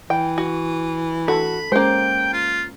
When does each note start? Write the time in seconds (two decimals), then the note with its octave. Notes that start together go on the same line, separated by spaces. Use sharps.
0.10 E3 G5
0.38 F#4
1.28 F#4 A4 B5
1.72 G#3 A#3 C#4 C5 G5
2.33 F4